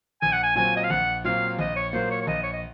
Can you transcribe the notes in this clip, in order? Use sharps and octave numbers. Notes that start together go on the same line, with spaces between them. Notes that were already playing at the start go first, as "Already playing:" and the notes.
A#1 G#5
F#5
G#5
A#2 F#3 C4 F4 G#5
D#5
F5
A#1 F#5
A#2 F#3 C4 F4 F5
A#1 D#5
C#5
A#2 F#3 A#3 C5
C#5
C#5
A#1 D#5
C#5
D#5